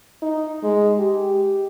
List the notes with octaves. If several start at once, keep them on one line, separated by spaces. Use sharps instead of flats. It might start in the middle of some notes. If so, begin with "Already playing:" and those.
D#4
G#3
G4